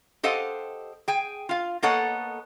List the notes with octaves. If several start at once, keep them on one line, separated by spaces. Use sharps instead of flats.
G4 A4 C5 D#5 F5 F#5
G#4 G5
F4 F5
A#3 B3 A4 C#5 D#5 F#5